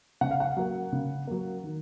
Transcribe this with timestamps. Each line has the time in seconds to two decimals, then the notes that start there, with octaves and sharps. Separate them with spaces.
0.21 C#3 F#5
0.31 F5
0.40 F#5
0.57 F#3 A#3
0.92 C#3
1.27 F#3 A#3
1.64 D#3